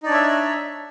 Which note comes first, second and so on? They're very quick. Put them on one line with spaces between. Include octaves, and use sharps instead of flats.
D#4 D5 D4 C#5 E5